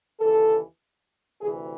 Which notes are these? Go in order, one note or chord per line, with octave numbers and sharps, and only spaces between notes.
D#2 C#3 E3 A4
D2 C3 E3 G#4